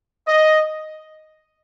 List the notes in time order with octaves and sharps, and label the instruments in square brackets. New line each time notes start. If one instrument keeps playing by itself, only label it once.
[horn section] D#5